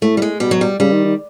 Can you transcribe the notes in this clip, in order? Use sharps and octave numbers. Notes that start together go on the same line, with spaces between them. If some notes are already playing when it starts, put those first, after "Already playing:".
A2 A3
G3
G#3
B2 G3
F#3
G3
C#3 G3
D#3
D#3